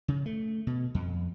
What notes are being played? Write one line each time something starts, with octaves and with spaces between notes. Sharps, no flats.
C#3
A3
B2
F2